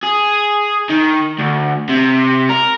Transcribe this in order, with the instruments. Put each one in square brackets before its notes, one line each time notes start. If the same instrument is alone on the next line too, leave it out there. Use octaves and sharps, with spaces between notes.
[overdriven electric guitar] G#4
D#3
D2
C3
A#4